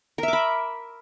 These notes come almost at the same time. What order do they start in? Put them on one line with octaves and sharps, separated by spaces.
A#4 E5 D6 B5